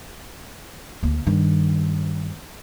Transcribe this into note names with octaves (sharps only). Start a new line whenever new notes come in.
D2 A#3
G2 D#3